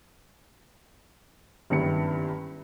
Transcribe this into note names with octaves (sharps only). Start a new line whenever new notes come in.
F#1 G2 D#3 B3 E4 C#7